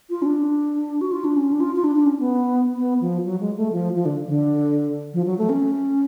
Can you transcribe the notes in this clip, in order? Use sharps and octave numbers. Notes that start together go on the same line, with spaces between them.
F4
C#4
D4
F#4
F4
D4
C#4
D4
F4
F4
D4
D4
C#4
B3
B3
F3
F#3
G#3
A3
F3
F3
D3
D3
F3
F#3
A3
C#4